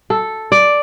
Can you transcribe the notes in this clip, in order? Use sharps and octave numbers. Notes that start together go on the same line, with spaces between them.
A4
D5